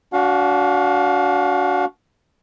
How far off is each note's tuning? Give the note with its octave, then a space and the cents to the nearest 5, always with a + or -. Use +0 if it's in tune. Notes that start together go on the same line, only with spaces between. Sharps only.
D4 -35 F#4 +0 F5 +25